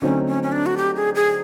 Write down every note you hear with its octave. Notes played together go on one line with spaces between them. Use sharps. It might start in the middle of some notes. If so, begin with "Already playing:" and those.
D3 F#3 A3 C4 C#4 D#4
C#4
C#4
D4
F#4
G4
G#4
G#4